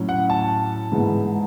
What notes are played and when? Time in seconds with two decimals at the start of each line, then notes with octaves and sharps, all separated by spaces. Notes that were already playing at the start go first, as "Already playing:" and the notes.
Already playing: A2 F#3 C#4
0.09 F#5
0.30 A5
0.92 G#2 E3 B3